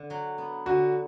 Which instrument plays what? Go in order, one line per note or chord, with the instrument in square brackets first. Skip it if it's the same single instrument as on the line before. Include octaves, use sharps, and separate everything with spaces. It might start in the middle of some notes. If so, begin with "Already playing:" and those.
Already playing: [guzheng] D3
F#3
B3
[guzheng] D3 [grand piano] F#4